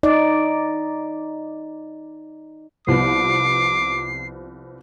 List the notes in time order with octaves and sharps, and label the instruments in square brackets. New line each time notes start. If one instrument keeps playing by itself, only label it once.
[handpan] D#4 D5
[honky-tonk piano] C2 F3 B3 [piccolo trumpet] D6 [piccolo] C7